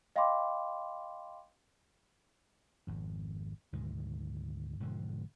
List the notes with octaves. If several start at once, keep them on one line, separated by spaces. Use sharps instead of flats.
D#5 F5 G5 B5 C6 D6
G#1 F2
D2 G#2 B2 D#3
E1 G#2 D3 F3